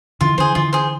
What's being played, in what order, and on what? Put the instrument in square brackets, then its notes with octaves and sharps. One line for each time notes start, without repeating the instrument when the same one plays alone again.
[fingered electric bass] D3 E3 [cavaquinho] F4
[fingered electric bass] D3 E3 [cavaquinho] G#4 C5
[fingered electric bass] D3 E3 [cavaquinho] F4
[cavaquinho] G#4 C5